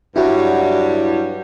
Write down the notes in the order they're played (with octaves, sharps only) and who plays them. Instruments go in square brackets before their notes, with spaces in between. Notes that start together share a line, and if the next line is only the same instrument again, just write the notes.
[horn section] G2 F#3 G3 [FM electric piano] E4 F#4